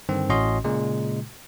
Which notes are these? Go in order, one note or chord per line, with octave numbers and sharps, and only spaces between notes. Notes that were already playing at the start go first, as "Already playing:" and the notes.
G2 D3 D#3 C4
A1 A2 C#4 F#4 D#5 C6
A#2 C#3 G#3